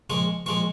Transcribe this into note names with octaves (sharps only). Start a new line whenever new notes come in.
A#2 F3 G#3 C#6
A#2 F3 G#3 C#6